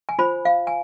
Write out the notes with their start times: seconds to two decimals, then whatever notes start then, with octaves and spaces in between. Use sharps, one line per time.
0.09 G#5
0.19 F4 C5 B5
0.45 F5
0.67 G#5